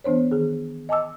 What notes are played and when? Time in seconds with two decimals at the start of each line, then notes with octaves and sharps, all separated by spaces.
0.04 E3 B3 D4 C5 C#5
0.31 D#3 G#4
0.89 D#5 G#5 A5 D6 E6